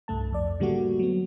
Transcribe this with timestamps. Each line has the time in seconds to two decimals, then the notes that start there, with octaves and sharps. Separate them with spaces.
0.08 C2 G2 A3 A5
0.32 F2 D5
0.60 A2 D3 G3 A3 A#3 F#4
0.99 F#3 B3